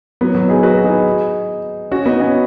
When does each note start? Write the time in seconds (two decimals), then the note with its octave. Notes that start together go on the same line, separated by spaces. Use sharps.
0.21 F#3 B3
0.35 F#3 B3
0.49 D#4 G#4
0.63 F#4 B4
0.77 F#4
0.84 D#4 G#4
1.91 C#4 F#4
2.06 B3 D#4
2.20 C#4 F#4